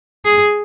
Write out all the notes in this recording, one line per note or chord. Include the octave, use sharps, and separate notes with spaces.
G#4